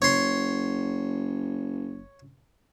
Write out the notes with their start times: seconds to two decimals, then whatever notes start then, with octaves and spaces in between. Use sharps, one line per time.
0.02 F#1 C#5 C6